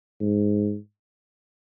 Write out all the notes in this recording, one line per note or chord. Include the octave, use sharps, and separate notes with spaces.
G#2